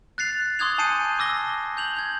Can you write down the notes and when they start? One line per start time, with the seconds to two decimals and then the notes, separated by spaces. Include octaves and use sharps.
0.18 F#6 A6 C7 F7
0.59 C6 D6 D#6 F#6 G#6 F7
0.78 G#5 A5 G6 C7 C#7 D#7
1.18 A5 D6 E6 A#6 G7
1.77 G6 F7 F#7
1.97 G6 G#6